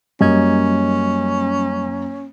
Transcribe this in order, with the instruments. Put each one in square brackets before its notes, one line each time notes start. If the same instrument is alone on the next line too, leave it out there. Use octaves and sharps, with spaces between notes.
[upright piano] F#2 A#3 [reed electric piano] G3 D#5 G#6 [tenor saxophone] C#4